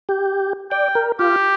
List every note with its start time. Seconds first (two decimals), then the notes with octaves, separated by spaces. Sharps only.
0.09 G4
0.71 D5 G5
0.95 A#4
1.19 F4 G4